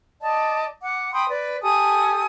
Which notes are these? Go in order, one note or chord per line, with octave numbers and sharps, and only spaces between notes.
D5 D#5 A5
F#5 D6
G5 B5 C6 D#6
B4 D5
G4 A4 G#5 D#6